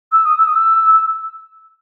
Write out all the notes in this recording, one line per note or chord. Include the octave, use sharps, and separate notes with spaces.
E6
D#6
E6
D#6
E6